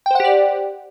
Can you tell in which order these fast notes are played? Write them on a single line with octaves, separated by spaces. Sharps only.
G5 C5 F#5 G4 D5